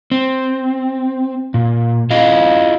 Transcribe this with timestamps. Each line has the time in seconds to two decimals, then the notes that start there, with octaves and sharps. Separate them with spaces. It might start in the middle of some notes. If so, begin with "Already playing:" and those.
0.12 C4
1.54 A#2
2.10 E4 F4 D#5 F5